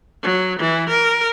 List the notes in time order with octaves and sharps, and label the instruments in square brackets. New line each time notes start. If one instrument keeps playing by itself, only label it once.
[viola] F#3
E3
A#4